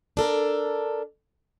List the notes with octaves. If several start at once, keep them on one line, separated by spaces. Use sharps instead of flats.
D4 A4 A#4